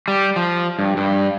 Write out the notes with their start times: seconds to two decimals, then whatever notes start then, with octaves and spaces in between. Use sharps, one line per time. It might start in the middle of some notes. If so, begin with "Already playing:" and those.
0.08 G3
0.36 F3
0.79 G2
0.97 G2